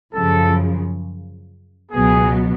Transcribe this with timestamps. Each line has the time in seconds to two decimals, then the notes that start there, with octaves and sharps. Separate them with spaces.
0.14 F#2 C#3 F3 A4
1.92 C#2 B2 F#3 B3 G#4